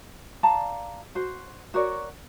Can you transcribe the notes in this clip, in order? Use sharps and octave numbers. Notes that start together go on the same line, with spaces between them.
D5 F5 A5 A#5
F#4 C5
F#4 A#4 C#5 D5